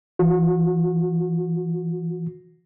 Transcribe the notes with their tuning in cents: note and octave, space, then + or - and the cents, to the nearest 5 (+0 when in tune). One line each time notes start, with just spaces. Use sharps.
E3 +20 F#4 -30